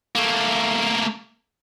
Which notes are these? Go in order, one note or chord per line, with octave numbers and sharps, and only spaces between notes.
A3 A#3